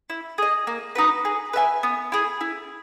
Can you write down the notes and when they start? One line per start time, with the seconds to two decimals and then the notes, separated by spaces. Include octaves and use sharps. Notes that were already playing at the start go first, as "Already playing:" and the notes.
0.10 E4
0.38 G#4 D#5
0.67 A#3
0.95 D#4 F#4 B4
1.25 G#4
1.53 B4 E5 G#5
1.83 B3
2.12 E4 G#4
2.41 E4